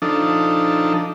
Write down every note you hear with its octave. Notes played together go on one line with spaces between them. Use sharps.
F3 D4 D#4 A4